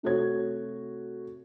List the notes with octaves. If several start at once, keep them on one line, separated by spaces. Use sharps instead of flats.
C3 A3 F#4 C#5 G#6